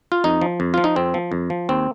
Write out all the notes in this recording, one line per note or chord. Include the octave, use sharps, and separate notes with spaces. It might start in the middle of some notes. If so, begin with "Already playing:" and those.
F4
F2 D#4
F3
F2
F3 F4
D#4
F2 C4
F3
F2
F3
D#2 C4